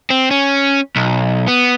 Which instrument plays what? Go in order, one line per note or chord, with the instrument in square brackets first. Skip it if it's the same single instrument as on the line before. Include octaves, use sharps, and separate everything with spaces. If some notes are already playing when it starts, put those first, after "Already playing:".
[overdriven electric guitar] C4
C#4
B1
B3